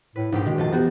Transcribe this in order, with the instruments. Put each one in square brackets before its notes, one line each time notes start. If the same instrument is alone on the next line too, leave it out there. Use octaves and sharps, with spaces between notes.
[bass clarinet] A2 [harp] B4
[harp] A#1 G4 [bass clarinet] G#2
[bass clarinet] B2 [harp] D#3 G#3
[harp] F1 F4 A5
[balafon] E3 B3 G4 [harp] F#4